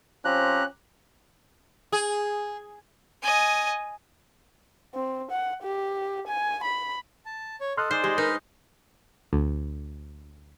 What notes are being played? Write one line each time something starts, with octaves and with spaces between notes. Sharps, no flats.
F3 C4 C#4 G4 A#5 F#6
G#4
D#5 G#5
C4
F#5
G4
G#5
B5
A5
C#5
A4 D#5 C6 F6 F#6
D#4 G#4 C5 D5
G#3 G4
D#4 A#4 B4 F6
D2